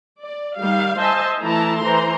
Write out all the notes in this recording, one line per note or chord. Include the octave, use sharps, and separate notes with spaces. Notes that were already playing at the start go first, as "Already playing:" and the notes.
D5
D#3 G3 F5
C5 D#5 E5 G#5 A5
E3 A3 E4 A5 A#5
E3 C5 A#5 C6